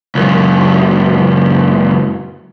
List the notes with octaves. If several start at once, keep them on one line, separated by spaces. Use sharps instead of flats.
C#2 F#2